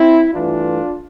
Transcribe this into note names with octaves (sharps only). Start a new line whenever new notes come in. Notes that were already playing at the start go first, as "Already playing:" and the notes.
Already playing: C4 E4
G2 E3 A3 D4 F4